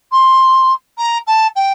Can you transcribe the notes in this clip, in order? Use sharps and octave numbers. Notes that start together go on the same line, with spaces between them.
C6
A#5
A5
G5